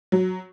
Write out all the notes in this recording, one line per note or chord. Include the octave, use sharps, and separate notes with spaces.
F#3